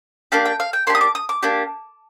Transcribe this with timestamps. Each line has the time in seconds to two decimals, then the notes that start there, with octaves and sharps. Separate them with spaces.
0.32 A#3 D4 G4 F5
0.46 G5
0.60 F5
0.73 G5
0.87 A#3 D4 G4 C6
0.95 D#6
1.01 D6
1.15 D#6
1.29 D6
1.43 A#3 D4 G4